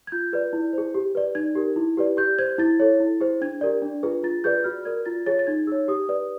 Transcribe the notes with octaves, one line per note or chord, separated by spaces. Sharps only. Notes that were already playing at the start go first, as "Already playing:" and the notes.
G#6
F4 G6
G#4 B4 D5
E4
G#4 C5
G4
B4 D5
D#4 G#6
G4 A#4
E4
G4 B4 D5
G4 G6
C5 G#6
E4 A6
A4 C#5
E4
G#4 C5
D4 G#6
G4 A#4 D5
D4
F4 G#4 B4
F4 A6
G#4 B4 D5 G6
F#4 F6
A#4 D5 G#6
F4 A6
G#4 C#5 A6
A6
D#4 G#6
G#4 C#5 E6
G4 D#6
B4 D5